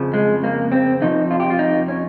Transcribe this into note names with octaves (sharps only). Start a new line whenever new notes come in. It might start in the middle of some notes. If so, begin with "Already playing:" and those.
Already playing: F2 C#3 F3
G#3
A#3
C4
F2 C3 F3 D#4
F4
G4
F4
D#4
C#4